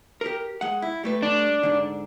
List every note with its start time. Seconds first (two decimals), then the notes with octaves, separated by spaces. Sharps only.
0.21 G4 A#4
0.61 G#3 F#5
0.82 E4
1.03 G3 A3 B4
1.23 D4
1.63 G#2 D3